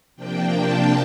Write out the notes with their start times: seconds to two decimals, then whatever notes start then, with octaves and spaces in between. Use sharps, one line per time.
0.16 C3 F3 A#3 D4 G5
0.57 A5